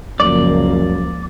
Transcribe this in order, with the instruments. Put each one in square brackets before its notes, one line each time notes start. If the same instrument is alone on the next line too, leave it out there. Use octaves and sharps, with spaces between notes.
[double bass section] C#2 F3 A#3 [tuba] F#2 [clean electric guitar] D5